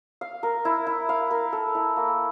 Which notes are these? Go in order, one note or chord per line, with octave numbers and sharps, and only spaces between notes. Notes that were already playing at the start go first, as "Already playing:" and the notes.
F5
A#4
E4
E4
F5
A#4
A4
E4
A#3